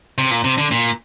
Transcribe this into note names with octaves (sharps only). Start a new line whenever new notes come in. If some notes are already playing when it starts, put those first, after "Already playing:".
C3
A#2
C3
D3
A#2